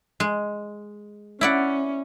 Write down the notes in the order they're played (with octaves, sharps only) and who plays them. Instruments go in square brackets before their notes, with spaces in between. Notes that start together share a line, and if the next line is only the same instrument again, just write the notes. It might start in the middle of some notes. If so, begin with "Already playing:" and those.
[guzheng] G#3
[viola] C#4 [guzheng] E4 D5 F#5